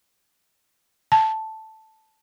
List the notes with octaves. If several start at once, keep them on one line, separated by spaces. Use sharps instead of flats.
A5